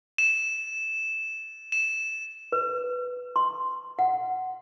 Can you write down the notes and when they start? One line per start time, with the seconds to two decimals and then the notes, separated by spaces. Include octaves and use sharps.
0.18 E7
1.72 E7
2.52 B4
3.36 C6
3.99 F#5